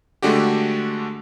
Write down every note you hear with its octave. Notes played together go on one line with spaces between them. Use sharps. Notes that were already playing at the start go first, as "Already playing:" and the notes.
D3 G#3 A3 D4 F#4 G4